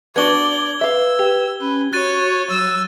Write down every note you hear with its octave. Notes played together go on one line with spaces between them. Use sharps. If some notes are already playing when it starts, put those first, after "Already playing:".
B3 D4 F#4 D5 G#6 G7
B4 E5 F5 E6
G4
C#4 B4
F#4 C#5 F#6 A6 D#7
F#3 E6